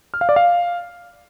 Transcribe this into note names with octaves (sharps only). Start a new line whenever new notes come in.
F6
F5
D5
F5